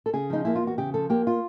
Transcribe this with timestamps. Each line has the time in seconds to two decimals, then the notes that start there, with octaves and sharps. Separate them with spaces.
0.06 A4
0.13 C#3 G#4
0.30 F3 D#4
0.45 A#3 E4
0.55 F4
0.62 E2 F#4
0.78 C#3 G4
0.94 F3 A4
1.10 A#3 G4
1.27 F4